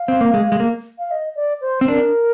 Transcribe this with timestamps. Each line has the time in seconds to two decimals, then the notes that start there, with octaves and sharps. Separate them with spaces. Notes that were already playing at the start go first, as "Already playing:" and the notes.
Already playing: F5
0.08 C4
0.21 A#3
0.34 G#3
0.52 G#3
0.60 A#3
0.98 F5
1.11 D#5
1.36 D5
1.61 C5
1.81 C4
1.88 D4 A#4